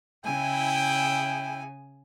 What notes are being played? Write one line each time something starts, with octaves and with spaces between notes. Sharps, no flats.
C#3 E4 G5 G#5